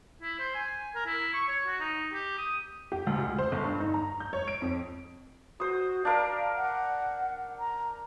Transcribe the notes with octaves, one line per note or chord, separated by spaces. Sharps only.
E4
C5
G#5
A#4
E4
C#6
C#5
F#4
D#4
G4
D#6
G4
D2
C#2
C5
G1
G2
D#4
A#5
G6
C#5
D7
F2
F#4 C5 D#6
D4 A#4 F5
F#5
A#5